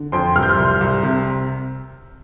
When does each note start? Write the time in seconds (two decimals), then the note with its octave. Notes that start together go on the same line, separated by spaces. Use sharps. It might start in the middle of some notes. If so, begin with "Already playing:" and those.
Already playing: D3
0.12 F2 G5 C6
0.35 C2 F6
0.43 G6
0.49 C6 F6
0.58 C2
0.81 C2
1.03 C3